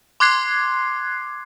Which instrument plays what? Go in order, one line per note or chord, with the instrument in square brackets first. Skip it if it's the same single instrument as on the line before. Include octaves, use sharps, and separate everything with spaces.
[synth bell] C6 D6 F#6 G#6 C7